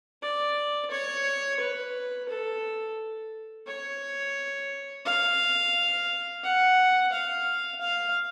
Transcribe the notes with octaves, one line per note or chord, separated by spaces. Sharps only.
D5
C#5
B4
A4
C#5
F5
F#5
F5
F5